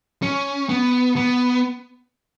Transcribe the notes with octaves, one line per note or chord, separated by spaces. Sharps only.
C#4
B3
B3